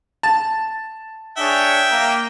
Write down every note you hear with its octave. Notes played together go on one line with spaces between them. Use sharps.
A5
D4 G#4 C#5 E5 G5
A#3